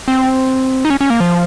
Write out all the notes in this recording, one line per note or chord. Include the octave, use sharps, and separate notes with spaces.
C4
D#4
C#4
C#4
A#3
F3